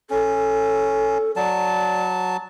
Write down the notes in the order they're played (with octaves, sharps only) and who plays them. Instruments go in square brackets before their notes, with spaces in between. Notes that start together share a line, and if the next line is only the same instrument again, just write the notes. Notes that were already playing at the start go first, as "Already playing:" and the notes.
[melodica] C#4 [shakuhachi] A4
[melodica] F#3 A5 [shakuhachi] D5